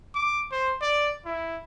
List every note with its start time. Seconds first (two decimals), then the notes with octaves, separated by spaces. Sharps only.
0.15 D6
0.52 C5
0.82 D5
1.26 E4